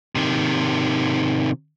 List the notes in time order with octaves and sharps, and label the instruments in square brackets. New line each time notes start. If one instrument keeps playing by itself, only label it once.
[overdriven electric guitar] C3 D#3